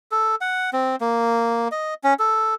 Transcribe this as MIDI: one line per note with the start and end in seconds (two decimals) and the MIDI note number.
0.11 0.35 69
0.41 0.70 78
0.73 0.96 60
1.01 1.68 58
1.72 1.94 75
2.04 2.14 61
2.19 2.55 69